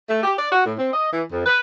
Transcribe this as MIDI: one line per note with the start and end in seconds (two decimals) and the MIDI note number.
0.10 0.21 57
0.23 0.33 67
0.39 0.48 74
0.52 0.61 66
0.66 0.74 45
0.79 0.92 60
0.93 1.08 75
1.12 1.24 52
1.33 1.43 41
1.46 1.60 71